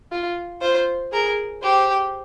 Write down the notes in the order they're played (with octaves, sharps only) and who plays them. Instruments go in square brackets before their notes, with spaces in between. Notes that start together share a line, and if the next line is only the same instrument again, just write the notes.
[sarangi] F4
[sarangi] F4 [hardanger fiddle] C5
[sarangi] G#4 [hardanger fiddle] A#4
[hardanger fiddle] G4 [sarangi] C5